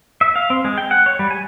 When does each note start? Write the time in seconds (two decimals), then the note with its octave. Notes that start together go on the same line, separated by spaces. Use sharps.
0.21 E5
0.36 F5
0.50 C4
0.65 G#3
0.78 G5
0.91 F#5
1.06 C#5
1.19 G3
1.31 G#5